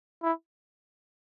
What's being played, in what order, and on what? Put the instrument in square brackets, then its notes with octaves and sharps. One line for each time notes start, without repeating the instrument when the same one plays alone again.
[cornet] E4